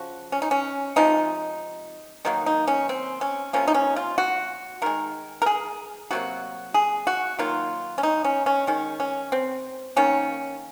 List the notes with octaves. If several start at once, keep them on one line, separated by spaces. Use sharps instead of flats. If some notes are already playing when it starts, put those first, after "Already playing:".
Already playing: C#3 F3 F#4
C#4
D#4
C#4
C3 F3 G#3 D#4
D#3 F#3 A#3 D#4
D#4
C#4
C4
C#4
C3 F3 A#3 C#4
D#4
C#4
F4
F#4
D#3 G#3 A#4
A#4
G#4
C3 F#3 A#3 F#4
G#4
F#4
D#3 F#3 A#3 F4
C#4
D#4
C#4
C#4
D#3 G#3 C#4
C#4
C4
D#3 A#3 C#4